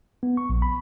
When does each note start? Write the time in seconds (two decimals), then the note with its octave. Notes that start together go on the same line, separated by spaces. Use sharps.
0.23 B3
0.37 C#6
0.50 A#1
0.62 B5